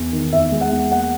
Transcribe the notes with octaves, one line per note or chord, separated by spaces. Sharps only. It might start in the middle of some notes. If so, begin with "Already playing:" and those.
Already playing: E2
D#3
E2 E5
G#3
F#5
E2
A#3 F#5